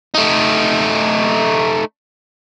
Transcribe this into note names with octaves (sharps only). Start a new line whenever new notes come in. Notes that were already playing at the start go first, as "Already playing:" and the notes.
A3 D#4